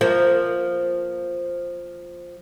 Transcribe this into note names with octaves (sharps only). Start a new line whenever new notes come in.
F3 A#3